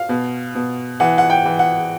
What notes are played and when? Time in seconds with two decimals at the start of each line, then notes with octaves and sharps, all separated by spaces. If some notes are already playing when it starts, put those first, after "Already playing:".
Already playing: F5
0.09 B2
0.55 B2
1.00 E3 F#5
1.18 F#5
1.30 G5
1.45 E3
1.59 F#5